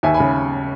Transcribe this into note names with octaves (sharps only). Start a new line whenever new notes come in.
D#2 E5 G#5
G#5 B5
C#3